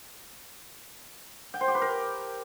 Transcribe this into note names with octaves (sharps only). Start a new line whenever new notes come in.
G5
C5
G4
B4
A#4